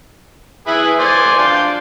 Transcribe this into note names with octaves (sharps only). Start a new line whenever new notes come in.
E4 G#4 B4
C5 D5 G#5
D4 F4 G5